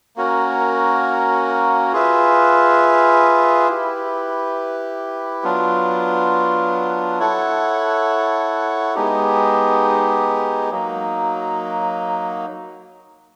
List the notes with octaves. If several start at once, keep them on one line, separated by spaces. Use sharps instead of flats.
A#3 C#4 F#4 A#4
F4 G#4 B4 E5
E4 G4 B4
F#3 B3 D4 F4
E4 A4 C#5 F#5
G#3 B3 D#4 G4
F#3 A#3 D#4